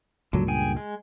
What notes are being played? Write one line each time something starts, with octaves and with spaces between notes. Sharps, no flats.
C#2 G2 A#2 D3 F#3
G#4 G5 G#5
G#3